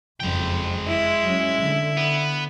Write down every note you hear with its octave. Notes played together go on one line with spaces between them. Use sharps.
F#1 F2 G#3 G5
E4
F#3 C#4
D3
B3